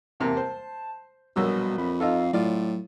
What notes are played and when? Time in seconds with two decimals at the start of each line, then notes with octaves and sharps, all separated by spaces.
0.20 E2 C3 A#3 A5
0.37 C5
1.36 A#1 B2 F#3 G3 E6
1.78 F2 B5
2.00 D#4 F4 A4 F5
2.33 A2 F#3 F4 D5